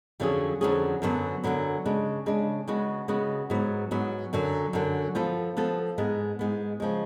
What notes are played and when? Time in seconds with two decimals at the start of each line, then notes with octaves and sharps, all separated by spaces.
0.20 F2 D3 F#3 C#4 G#4
0.61 F2 D3 F#3 C#4 G#4
1.02 F#2 D3 F#3 B3
1.44 F#2 D3 F#3 B3
1.85 C#3 G#3 D4
2.26 C#3 G#3 D4
2.68 C#3 G#3 B3 F#4
3.08 C#3 G#3 B3 F#4
3.50 G#2 F#3 B3
3.91 G#2 F#3 B3
4.33 F#2 D3 F#3
4.73 F#2 D3 F#3
5.15 F3 B3 F4 A4
5.57 F3 B3 F4 A4
5.98 G#2 G#3 B3
6.39 G#2 G#3 B3
6.80 C#3 F3 G#3